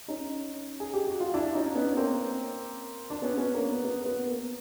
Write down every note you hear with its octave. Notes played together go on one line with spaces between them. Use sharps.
C#4 D#4
G#4
G4
F#4
F4
D4 E4
C#4 D#4
B3 C#4
A#3 C4
D4
B3 C#4
B3 C#4
A#3
B3
B3
B3
A#3